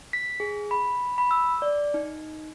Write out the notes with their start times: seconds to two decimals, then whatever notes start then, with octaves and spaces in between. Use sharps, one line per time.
0.13 B6
0.40 G#4
0.71 B5
1.18 B5
1.31 E6
1.62 D5
1.94 D#4